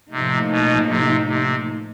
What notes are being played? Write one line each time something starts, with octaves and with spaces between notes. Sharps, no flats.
A2 C3 F3 A#3 D#4
B2
C3
C3